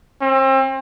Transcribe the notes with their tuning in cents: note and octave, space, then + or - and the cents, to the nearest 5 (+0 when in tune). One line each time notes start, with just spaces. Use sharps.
C4 +35